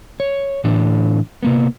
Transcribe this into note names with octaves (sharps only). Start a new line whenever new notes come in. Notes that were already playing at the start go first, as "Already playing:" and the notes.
C#5
A2 D3 E3 D4
C3 A#3 B3